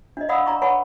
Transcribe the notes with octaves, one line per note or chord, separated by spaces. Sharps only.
D4 D#5
D5 F5 F#5 B5 D#6 E6
D4 D5 A#5 C#6
B4 C#5 F#5 G#5 B5 C#6